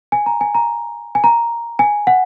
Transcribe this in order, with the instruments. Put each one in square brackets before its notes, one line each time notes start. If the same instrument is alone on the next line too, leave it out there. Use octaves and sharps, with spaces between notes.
[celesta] G#5
A#5
G#5
A#5
G#5
A#5
G#5
F#5